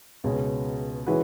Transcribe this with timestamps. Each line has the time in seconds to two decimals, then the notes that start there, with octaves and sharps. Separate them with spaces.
0.24 C#2 B2 G#3 C#4
1.07 E3 G#3 C#4 F#4 B4